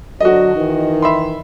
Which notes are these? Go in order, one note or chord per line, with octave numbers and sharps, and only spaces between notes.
D3 F#3 F#4 D#5
D#3 E3 D#4
E5 B5 C6